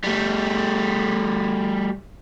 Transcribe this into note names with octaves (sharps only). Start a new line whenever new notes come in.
G3 A3